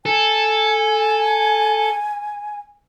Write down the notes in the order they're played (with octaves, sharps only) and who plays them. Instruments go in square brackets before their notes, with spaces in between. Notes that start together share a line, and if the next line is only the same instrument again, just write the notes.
[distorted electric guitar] A4 [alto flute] G#5